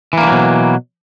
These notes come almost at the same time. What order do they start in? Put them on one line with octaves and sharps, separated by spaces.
E3 A#3 D3 F#3 B2